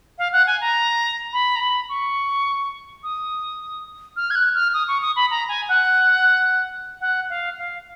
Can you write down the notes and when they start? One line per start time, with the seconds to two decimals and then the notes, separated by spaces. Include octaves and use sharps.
0.18 F5
0.33 F#5
0.47 G#5
0.61 A#5
1.33 B5
1.56 A#5
1.60 B5
1.89 C#6
3.03 D#6
4.17 F6
4.30 G#6
4.35 F#6
4.55 F6
4.74 D#6
4.88 C#6
5.02 D#6
5.16 B5
5.31 A#5
5.49 G#5
5.69 F#5
7.01 F#5
7.30 F5
7.58 F5